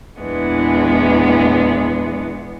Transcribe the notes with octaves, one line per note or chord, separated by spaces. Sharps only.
E2 A#2 E3 G#3 B3 D4